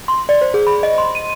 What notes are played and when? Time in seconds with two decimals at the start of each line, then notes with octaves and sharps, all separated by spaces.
0.08 C6
0.29 D5
0.42 C5
0.54 G#4
0.67 B5
0.83 D#5
0.98 C6
1.15 D#7